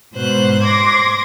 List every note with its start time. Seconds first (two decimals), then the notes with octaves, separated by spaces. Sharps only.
0.12 G#2 B2 C5 F#6
0.62 C6 D6 G#6 A#6